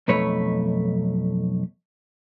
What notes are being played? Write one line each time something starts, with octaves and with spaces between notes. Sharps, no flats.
B1 F2 A3 B4 C#5